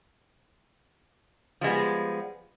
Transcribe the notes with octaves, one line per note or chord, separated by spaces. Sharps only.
F3 G3 G#3 B3